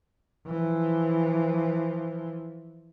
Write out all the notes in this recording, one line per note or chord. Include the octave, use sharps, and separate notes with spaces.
E3 F3